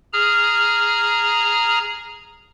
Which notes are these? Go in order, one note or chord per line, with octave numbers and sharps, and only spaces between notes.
G#4 A#5 F6